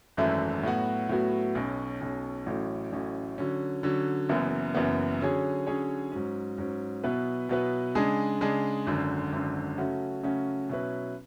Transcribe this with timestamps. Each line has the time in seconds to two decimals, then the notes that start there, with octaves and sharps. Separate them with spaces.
0.17 G#1 F#2 E3 A3 E4
0.63 A2 F#3 B3 F#4
1.09 A2 F#3 B3 F#4
1.55 B1 B2 F#3 C#4
2.01 B1 B2 F#3 C#4
2.46 A1 A2 F#3 C#4
2.92 A1 A2 F#3 C#4
3.38 D3 F#3 C#4
3.83 D3 F#3 C#4
4.29 F#1 F#2 E3 B3
4.75 F#1 F#2 E3 B3
5.21 D3 F#3 C#4 G#4 C#5
5.67 D3 F#3 C#4 G#4 C#5
6.12 G#2 F#3 C#4
6.58 G#2 F#3 C#4
7.04 B2 F#3 B3 E4 B4
7.49 B2 F#3 B3 E4 B4
7.95 C#3 G#3 D4 G#4
8.41 C#3 G#3 D4 G#4
8.87 G#1 F#2 D3
9.32 G#1 F#2 D3
9.78 C#3 F#3 A3 C#4 F#4
10.23 C#3 F#3 A3 C#4 F#4
10.69 B2 F#3 C#4 E4 B4